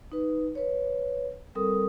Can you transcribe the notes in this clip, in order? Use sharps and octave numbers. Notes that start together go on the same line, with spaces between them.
D#4 B4
B4 C#5
G3 C4 A4 A#4 D#6